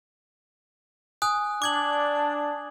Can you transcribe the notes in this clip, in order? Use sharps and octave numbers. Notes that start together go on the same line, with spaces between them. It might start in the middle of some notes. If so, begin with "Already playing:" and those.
G#5 D#6 F#6
D4 D6 G#6 F#7